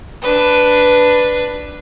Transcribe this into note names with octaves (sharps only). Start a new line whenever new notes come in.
D4 B4